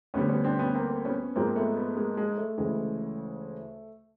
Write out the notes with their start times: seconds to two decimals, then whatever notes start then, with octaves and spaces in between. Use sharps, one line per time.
0.14 D2 D3 G3 B3 C#4
0.29 B3 C#4
0.44 C4 D4
0.59 B3 C#4
0.74 A#3 C4
1.05 B3 C#4
1.36 G#2 F3 G#3 A#3 C4
1.56 A3 B3
1.76 A3 B3
1.97 G#3 A#3
2.17 G#3
2.37 A3
2.58 D2 C#3 E3 G#3